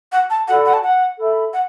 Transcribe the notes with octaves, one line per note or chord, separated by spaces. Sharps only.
F#5
A5
F#4 A4 D5 F#5 B5
F#5
A5
F#5
A4 E5 B5
F#5